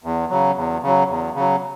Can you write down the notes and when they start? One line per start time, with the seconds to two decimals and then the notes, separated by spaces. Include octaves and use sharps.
0.04 E2
0.30 C#3 F#3
0.57 E2
0.83 C#3 F#3
1.09 E2
1.35 C#3 F#3